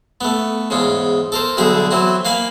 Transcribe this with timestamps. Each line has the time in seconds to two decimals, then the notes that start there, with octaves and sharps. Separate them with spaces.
0.21 A3 B3
0.70 E2 G#2 C#3 C#4
1.32 A4 A#4 C5
1.57 B1 D3 G3 G#4 E5
1.91 E3 F#3 C4 E4
2.25 A#3 F5 G#5 B5